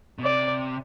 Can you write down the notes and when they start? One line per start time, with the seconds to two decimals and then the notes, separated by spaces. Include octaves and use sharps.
0.19 B2
0.24 C3 D5